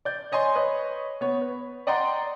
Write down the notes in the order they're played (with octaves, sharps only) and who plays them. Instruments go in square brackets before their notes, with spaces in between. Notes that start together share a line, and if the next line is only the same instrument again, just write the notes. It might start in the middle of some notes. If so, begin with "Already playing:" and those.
[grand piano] D5 G6
C#5 D#5 G#5 C6
B4 C#5 D#5
B3 C#5
B4
D5 D#5 F#5 G5 A#5 C6